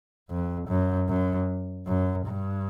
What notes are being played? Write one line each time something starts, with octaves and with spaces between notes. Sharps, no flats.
F2
F#2
F#2
F#2
G2